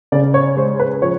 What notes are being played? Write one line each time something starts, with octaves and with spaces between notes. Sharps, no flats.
C#3 D5
C#5
G#3 C5
B4
F3 C#5